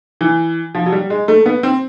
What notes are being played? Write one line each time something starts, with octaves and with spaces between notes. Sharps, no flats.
E3
F3
F#3
G3
G#3
A3
B3
C4